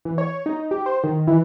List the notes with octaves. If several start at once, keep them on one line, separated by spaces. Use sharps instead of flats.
E3
C#5
D#4
G4
C5
D#3
E3